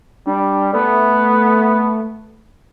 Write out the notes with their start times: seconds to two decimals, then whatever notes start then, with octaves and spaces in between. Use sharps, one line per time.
0.27 G3 D4
0.73 A3 B3